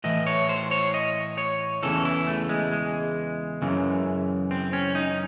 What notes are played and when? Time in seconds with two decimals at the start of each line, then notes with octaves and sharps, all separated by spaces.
0.04 A2 E3 D#5
0.27 C#5
0.49 C5
0.71 C#5
0.94 D#5
1.38 C#5
1.83 E2 C#3 E3 A4
2.05 E4
2.27 A3
2.49 G#3
2.72 G#3
3.62 F#2 C#3 E3
4.51 C4
4.73 C#4
4.95 D#4